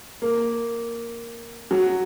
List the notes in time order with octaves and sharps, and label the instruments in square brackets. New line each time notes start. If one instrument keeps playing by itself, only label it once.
[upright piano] A#3
F#3